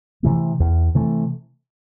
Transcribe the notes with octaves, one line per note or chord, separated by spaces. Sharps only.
C3 E3 A3
E2
C3 E3 A3